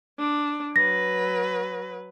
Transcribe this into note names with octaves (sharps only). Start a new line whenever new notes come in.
D4
F#3 B4 A#6